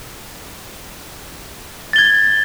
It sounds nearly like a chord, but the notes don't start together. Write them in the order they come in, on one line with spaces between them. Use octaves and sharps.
A6 G7 G#6